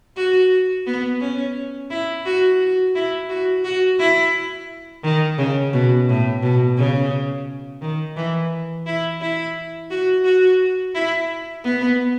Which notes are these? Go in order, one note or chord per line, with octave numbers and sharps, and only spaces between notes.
F#4
B3
C#4
E4
F#4
F#4
E4
F#4
F#4
E4
D#3
C#3
B2
A2
B2
C#3
D#3
E3
E4
E4
F#4
F#4
E4
B3